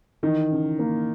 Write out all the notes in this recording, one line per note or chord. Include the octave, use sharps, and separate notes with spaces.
D#3 E3
C#3
A#3